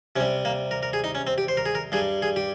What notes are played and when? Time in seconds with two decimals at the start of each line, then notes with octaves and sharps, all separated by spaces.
0.16 C3 C#4
0.20 G3
0.45 A#3
0.71 A#4
0.83 A#4
0.93 G#4
1.04 D#4
1.15 C#4
1.27 C4
1.38 G4
1.48 C5
1.57 A#4
1.66 G#4
1.75 A#4
1.92 G2 G3 G#4
2.22 G#4
2.36 G4